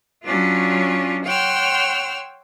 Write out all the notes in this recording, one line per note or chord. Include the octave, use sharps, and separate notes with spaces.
F#3 C#4 D4 F4
C#5 F#5 G5 C6 E6 F6